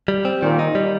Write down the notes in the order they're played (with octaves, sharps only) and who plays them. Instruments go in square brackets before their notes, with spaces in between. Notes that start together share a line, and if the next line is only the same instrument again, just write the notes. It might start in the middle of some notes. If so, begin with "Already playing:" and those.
[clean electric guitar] G3
C4
[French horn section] A#2 [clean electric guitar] D#3
[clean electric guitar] D#4
G3